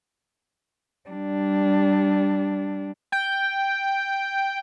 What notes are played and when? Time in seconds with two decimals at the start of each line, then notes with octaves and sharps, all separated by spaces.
1.10 G3 D4
3.12 G5